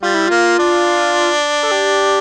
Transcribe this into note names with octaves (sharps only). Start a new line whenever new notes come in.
G3 F4
E4
A#3 F4
D4
A4
G4